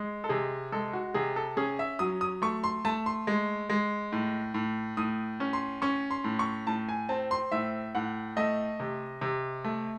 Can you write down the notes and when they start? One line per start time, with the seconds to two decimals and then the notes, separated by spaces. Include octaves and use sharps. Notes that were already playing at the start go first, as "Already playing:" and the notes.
Already playing: G#3
0.24 A4
0.29 C3 G#4
0.72 G#3 A4
0.93 F#4
1.14 C3 G#4
1.36 A4
1.57 C#4 G#4
1.79 E5
1.99 F#3 D#6
2.21 D#6
2.42 A3 C#6
2.64 C6
2.85 A3 A5
3.06 C6
3.27 G#3
3.70 G#3
4.12 A2
4.54 A2
4.97 A2 D#6
5.40 C#4
5.53 C6
5.82 C#4 C#6
6.11 C6
6.24 A2
6.39 C#6
6.67 A2 A5
6.89 G#5
7.09 C4 A5
7.31 C6
7.52 A2 E5
7.95 A2 F#5
8.37 A3 D#5
8.80 C3
9.21 C3
9.65 A3